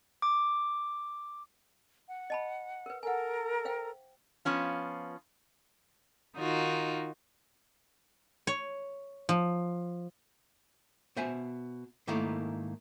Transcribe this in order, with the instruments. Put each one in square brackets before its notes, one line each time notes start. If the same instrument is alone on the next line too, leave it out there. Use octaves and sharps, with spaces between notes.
[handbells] D6
[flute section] F#5
[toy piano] D#5 A5 B5
A#4 B4
[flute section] A4 A#4 A#5 [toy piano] F#5 G#5
[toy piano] C5 F5 G5
[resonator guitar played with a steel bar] F3 B3 C#4 F4
[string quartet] D#3 D#4 F4 F#4
[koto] C#5
F3
[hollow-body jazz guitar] B2 C5 E5 G#5
G#2 D#3 A3 A#3 E4